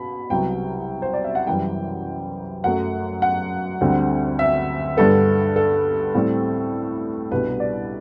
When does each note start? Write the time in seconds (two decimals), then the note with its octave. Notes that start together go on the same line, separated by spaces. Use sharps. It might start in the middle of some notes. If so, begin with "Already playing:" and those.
Already playing: B2 B5
0.30 C2 C3 F#3 B3 G5
1.02 C5
1.13 D5
1.24 E5
1.35 F#5
1.47 F#2 E3 G3 G5
2.64 F#2 F#3 A3 F#5
3.22 F#5
3.81 D2 D3 G3 C4
4.39 E5
4.97 G2 D3 G3 B3 A4
5.56 A4
6.15 A2 G3 C4
7.31 C2 B2 G3 D4 B4
7.60 D5